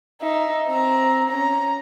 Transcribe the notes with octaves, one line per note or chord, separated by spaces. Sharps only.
D#4 E5
C4 A#5
C#4 A#5